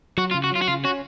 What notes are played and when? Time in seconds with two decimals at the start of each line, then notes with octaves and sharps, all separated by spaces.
0.18 F#3 F#4
0.31 F4
0.35 C#3
0.44 F#4
0.52 F#3 F4
0.62 F#4
0.68 C#3 F4
0.84 C#4 F#4